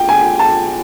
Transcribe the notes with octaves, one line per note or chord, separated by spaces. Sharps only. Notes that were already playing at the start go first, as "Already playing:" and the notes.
Already playing: G5
G#5
A5